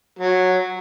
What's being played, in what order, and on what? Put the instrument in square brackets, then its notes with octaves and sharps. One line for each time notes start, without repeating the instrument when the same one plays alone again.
[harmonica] F#3